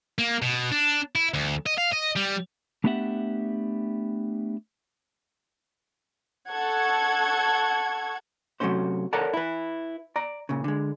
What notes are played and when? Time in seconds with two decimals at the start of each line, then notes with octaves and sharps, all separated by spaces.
0.18 A#3
0.42 B2
0.71 D4
1.15 E4
1.34 D2
1.66 D#5
1.78 F5
1.92 D#5
2.16 G3
2.84 A3 B3 D4 G4 E5 F#5
6.50 A4 F#5 C#6 G#6
8.60 C3 F#3 G3 A3 C#4 C5
9.13 A4 A#4 C#5 D5 F#5 A#5
9.33 E4 B4
10.16 D5 A#5
10.49 A#2 C#3
10.64 D3 G#3